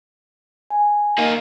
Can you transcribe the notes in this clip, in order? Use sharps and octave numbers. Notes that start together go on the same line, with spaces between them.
G#5
A#3 D#4